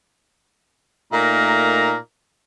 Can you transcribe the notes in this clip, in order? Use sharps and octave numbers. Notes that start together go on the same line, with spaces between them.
A#2 A3 D#4 A#4 A#5